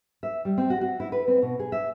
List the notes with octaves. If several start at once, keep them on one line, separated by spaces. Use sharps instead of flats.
E5
G3
C4
F#4
F#4
E4
B4
C4
B2
G#4
E5